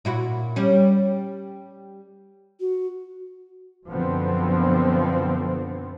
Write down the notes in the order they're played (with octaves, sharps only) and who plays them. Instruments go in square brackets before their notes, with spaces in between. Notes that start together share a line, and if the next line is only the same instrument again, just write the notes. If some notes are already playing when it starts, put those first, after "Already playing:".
[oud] A#2 E4 F#4
G3 C#4
[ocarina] F#4
[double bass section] F#2 B2 D3 F3 B3 C4